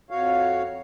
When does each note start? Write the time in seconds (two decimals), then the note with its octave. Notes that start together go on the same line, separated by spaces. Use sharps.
0.11 F2 F#4 C#5 F5